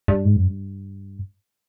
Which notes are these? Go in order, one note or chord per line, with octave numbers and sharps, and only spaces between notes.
G2
G#2
F#2
G2